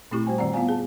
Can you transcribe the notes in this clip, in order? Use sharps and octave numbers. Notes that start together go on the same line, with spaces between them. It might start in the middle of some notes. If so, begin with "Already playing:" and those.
A#2 A3 C4 E4 G4 C#6
G3 F#4 C5 G5 G#5
F#2 D#3 C4 D5 F#5 A#5
B3 E4 F4 F5 F#5 G#5
G#4 A5